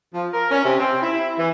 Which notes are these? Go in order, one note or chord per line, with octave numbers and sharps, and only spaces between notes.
F3
A#4
C#4
C3
C4
E4
E3